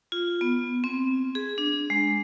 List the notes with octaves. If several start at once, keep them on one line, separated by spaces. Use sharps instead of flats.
F4
B3
C4
G#4
D4
G#3